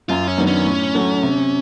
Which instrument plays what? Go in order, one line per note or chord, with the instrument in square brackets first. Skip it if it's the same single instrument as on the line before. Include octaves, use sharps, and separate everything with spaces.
[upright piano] F#2 [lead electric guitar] F4
[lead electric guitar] C#4
[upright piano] D#3 F#3 B3 D4
[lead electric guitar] C#4
[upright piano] A2
F#3 A3
C3